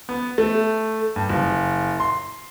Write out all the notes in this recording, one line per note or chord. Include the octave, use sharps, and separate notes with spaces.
B3
A3
G2
F#1
C6